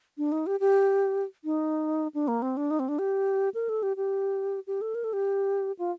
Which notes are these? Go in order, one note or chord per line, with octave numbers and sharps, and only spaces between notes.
D4
D#4
G4
G4
D#4
D4
A#3
C4
D4
D#4
C4
D4
G4
A#4
A4
G4
G4
G4
A4
A#4
A4
G4
F4